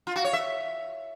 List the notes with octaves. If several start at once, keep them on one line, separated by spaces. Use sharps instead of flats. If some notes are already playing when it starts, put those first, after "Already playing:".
F4
F#4
C#5
E5